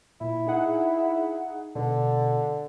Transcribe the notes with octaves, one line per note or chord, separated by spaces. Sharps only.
A#2 E4
D#4 G#4 F#5
B2 D3